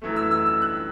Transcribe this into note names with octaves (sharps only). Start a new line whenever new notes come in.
F#2 E3 A3
E6
E6
E6
F#6